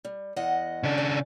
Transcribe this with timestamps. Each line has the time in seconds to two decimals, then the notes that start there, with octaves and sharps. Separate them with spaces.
0.05 G3
0.36 E2 D#5 F#5
0.83 C#3 D4
0.98 D5